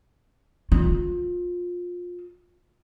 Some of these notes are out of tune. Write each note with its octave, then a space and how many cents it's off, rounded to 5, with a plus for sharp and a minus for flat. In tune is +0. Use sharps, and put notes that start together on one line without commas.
F4 +20